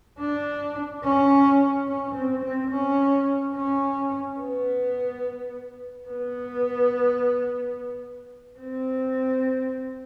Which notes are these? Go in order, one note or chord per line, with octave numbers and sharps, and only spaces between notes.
D4
C#4
C#4
C4
C4
C#4
C#4
B3
B3
C4